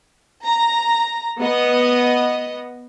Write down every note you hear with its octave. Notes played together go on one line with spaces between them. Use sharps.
A#5
B3 D#5